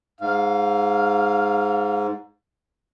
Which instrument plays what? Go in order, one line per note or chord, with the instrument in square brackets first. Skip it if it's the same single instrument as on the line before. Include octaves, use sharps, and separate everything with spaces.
[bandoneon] G#2 [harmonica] F5